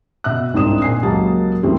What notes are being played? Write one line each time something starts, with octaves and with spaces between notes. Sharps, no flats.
B2 E5 F#6
C2 G#2 C4 D4 D#6 E7
A#2 G#5 C7
C#2 F#3 A#3 G4 A5
C2 E3 G3 A3 C4